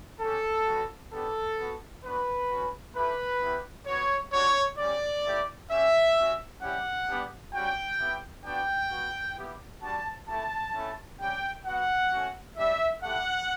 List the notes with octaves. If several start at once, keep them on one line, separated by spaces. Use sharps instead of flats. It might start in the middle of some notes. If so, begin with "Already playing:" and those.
C#4 G4 A4
G3 B3 F#4
B3 D4 G4 A4
B3 F#4
B3 D4 F#4 B4
C#4 F#4
A3 E4 G4 B4
B3 E4 G4
B3 F#4 C#5
G3 D4 F#4 C#5
G3 C#4 G4 D5
A3 E4 G4
C#4 G4 E5
C#4 F#4
G3 C#4 E4 G4 F#5
G3 B3 D4 G4
G3 C#4 F#4 G5
B3 E4 G4
B3 D4 F#4 G5
B3 F#4
B3 E4 G4
G3 D4 F#4 A5
A3 E4 G4 A5
A3 C#4 E4
G3 C#4 G4 G5
B3 F#4 F#5
A3 C#4 F#4
G3 D4 G4 E5
A3 E4 G4 F#5